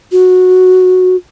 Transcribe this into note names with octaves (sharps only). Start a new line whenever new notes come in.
F#4